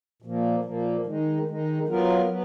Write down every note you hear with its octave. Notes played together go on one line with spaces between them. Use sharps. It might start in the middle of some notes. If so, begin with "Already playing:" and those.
A#2 F3 A#3
A#2 F3 A#3
D#3 G#3 D#4
D#3 G#3 D#4
F#3 B3 F4 A#4
F#3 B3